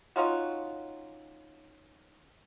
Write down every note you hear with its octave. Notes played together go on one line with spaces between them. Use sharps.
C#4 D#4 F4 F#4